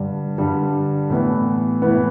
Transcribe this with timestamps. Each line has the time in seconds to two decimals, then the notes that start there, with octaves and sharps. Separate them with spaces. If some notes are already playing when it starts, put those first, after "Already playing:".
Already playing: G2 D3 G3
0.38 G2 D3 G3
1.10 A2 E3 B3
1.82 A2 E3 B3